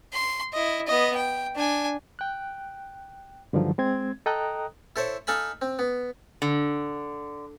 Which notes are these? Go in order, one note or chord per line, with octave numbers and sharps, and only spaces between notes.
C6
E4 D#5
B3 D#5
G5
D4 G#5
G5 F#6
G2 D3 D#3 F3 F#3
G#3 C4 G#6
A4 D#5 G5 A#5 D#6 F#6
E4 A4 C5 C#5
D#4 A4 F5 G#5 B5
C4
B3
D3